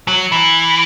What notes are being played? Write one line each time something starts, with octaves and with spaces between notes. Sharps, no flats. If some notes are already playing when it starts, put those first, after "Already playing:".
F#3
E3